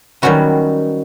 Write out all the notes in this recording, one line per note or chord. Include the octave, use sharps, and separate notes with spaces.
D#3 F#3 G3 C#4 F#4 B4